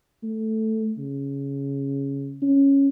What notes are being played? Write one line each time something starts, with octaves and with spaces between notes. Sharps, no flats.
A3
C#3
C#4